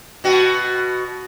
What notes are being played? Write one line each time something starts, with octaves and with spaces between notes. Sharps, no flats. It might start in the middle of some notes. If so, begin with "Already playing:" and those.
B2 F#4